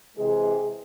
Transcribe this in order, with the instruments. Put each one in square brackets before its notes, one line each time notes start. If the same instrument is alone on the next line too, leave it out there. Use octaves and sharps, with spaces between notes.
[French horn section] C3 E3 G#3 G#4